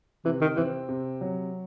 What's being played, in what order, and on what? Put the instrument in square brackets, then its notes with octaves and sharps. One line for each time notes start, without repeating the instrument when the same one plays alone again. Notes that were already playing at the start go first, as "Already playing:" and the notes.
[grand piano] C3 [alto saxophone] E3
[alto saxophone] D#3
[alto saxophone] E3 [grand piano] C4
[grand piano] C3
F#3